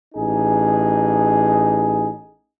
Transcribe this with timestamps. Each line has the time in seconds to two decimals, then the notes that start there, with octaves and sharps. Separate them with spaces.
0.15 A1 D#4 G#4